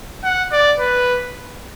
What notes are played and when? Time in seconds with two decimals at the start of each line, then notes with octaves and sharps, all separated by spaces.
0.24 F#5
0.52 D5
0.79 B4